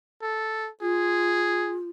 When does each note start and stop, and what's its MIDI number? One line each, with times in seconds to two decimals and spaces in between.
0.22 0.70 69
0.81 1.89 65
0.81 1.77 68